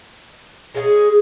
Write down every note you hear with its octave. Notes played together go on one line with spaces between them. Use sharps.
G#3 C#4 F4 G#4